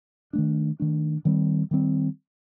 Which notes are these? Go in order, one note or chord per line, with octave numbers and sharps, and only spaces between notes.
D#3 A3 D4
D#3 A3 D4
D#3 G3 C4
D#3 G3 C4